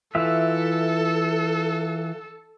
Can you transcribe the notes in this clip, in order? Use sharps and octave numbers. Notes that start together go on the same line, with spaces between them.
E3 F4 A4 E5